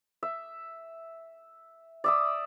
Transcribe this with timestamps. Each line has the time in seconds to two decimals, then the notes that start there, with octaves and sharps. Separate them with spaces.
0.23 E5
2.04 D5 E5 D#6